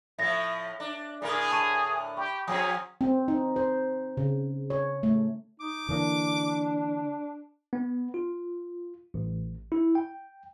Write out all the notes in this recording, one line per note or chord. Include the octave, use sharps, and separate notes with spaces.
A2 F3 E5 A#6
D4
A2 D3 G#4 A#4
A5 C#6 D#7
G4 B5 C#6
F3 C4 C#4 G#4 G5 D#6
C4
D#4
C5
C#3
C#5
A3
D#4 D6
D3 E3 A#3 D4
B3
F4
A1
E4
G5